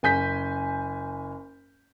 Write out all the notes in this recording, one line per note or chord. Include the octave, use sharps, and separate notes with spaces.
F#1 G#5 G6 B6